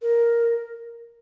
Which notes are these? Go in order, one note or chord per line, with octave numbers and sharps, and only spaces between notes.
A#4